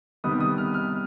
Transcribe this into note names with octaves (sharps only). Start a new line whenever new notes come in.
C3 D#3 G3 B3 D#6
D#6
F6
F6